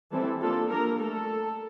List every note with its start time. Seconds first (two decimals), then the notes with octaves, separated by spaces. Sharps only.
0.12 E3 G3 C4 E4 A4
0.41 F3 A#3 D4 F4 A4
0.70 G3 A#3 D4 A#4
0.99 A3 A4